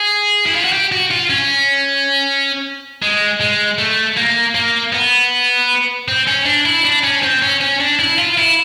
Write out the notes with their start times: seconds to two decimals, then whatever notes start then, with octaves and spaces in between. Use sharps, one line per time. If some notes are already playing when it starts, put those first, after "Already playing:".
Already playing: G#4
0.46 E4
0.55 F4
0.64 F#4
0.73 G4
0.92 F#4
1.11 F4
1.30 C#4
3.02 G#3
3.41 G#3
3.78 A3
4.17 A#3
4.55 A#3
4.93 B3
6.08 C4
6.27 C#4
6.46 D4
6.65 E4
6.85 D4
7.04 C#4
7.23 C4
7.42 C#4
7.61 C#4
7.80 D4
7.99 E4
8.18 F4
8.38 E4